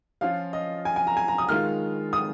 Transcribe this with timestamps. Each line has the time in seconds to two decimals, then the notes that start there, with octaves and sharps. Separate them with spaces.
0.21 F3 C#4 F4 F5
0.53 D#5
0.85 G#5
0.96 G#5
1.07 A#5
1.17 G#5
1.28 A#5
1.38 D#6
1.49 D#3 G#3 F4 F6
2.13 D#6